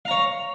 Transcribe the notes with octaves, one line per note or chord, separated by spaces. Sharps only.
C#5 F5 A#5